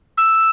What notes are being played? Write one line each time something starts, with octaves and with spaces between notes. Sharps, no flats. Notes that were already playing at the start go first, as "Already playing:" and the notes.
E6